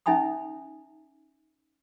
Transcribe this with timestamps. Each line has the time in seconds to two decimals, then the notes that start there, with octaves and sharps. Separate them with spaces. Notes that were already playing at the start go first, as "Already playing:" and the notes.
0.06 C#4 D#4 E5 G#5 B5 D#6